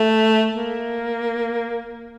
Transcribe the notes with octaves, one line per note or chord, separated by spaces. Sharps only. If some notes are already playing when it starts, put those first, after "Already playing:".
Already playing: A3
A#3